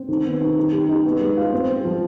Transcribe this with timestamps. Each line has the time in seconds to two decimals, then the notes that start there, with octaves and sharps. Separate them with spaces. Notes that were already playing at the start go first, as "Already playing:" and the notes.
Already playing: C4
0.09 D#3
0.24 B3
0.41 D#3
0.56 D#4
0.72 G4
0.89 D#4
1.04 B3
1.20 G#3
1.37 F4
1.52 C4
1.69 C4
1.85 F3